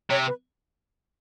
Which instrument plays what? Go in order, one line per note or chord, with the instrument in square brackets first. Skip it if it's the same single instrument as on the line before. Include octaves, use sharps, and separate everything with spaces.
[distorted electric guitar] C3 [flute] C#5
[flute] B4